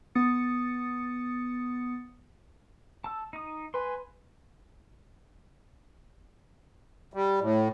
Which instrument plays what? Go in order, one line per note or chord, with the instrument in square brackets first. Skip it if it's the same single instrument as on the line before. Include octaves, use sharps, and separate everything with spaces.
[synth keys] B3 D#6 A6 C#7
[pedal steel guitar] A5 E6
D#4 D#6
[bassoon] B4 [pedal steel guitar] G#5 C6
[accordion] G3
A2